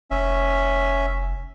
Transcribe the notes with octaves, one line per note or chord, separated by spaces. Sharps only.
F1 C#4 E5